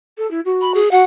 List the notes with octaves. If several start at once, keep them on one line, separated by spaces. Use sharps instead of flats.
A4
E4
F#4
B5
G#4
F#4 F#5